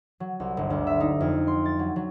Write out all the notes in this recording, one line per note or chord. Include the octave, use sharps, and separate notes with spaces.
F#3
C2
G1
D2
E5
D#4
F2
C6
A6
F#3
F#3